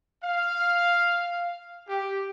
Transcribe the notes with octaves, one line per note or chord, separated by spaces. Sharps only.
F5
G4